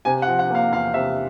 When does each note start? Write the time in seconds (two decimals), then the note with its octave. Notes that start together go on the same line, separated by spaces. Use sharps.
0.05 C3 G#5
0.22 F#5
0.27 F3
0.39 F#5
0.50 A#3 F5
0.72 E2 F5
0.94 C3 E5